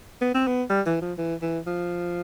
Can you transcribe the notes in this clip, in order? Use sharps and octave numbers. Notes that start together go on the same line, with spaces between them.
B3
C4
B3
G3
E3
F3
E3
E3
F3